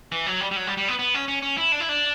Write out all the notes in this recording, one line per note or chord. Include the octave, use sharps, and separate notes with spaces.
E3
F#3
G3
G3
F#3
G3
G3
B3
B3
C#4
C#4
C#4
E4
D4
E4
D4